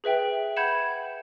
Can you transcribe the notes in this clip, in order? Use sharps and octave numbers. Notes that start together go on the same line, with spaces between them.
G#4 B4 E5 G5
F#5 B5 G6 G#6 C#7 E7